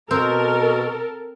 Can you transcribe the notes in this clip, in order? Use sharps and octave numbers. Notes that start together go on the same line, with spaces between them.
B2 C4 A4 A#4